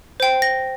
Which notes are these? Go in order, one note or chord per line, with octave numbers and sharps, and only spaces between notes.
C5 G5
A#6